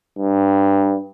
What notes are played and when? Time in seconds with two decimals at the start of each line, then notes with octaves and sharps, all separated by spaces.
0.18 G2